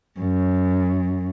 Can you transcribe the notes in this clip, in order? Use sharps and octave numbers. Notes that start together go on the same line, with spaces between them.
F#2